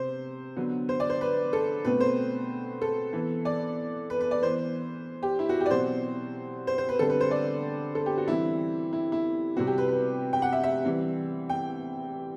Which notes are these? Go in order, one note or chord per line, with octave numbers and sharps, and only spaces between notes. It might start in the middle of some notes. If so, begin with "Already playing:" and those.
Already playing: C3 C5
D3 F#3 B3
C5
D5
C5
B4
A4
B2 A3 C4 B4
C5
A4
E3 B3
D5
B4
B4
D5
E3 B3 C5
G4
E4
F#4
G4
D5
B2 F#3 C4 C5
C5
C5
B4
D3 G3 C4 A4
B4
C5
D5
A4
G4
F#4
E3 G3 C4 E4
E4
E4
C3 G3 C4 F#4
G4
B4
B4
G5
F#5
E5
E5
E3 G3 C4
G5